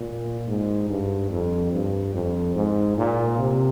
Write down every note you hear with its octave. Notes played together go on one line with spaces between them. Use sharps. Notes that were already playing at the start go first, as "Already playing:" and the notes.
Already playing: A#2
G#2
G2
F2
G2
F2
G#2
A#2
C3